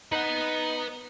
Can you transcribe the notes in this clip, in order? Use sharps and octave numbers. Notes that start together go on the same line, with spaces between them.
D#4 B4 F#5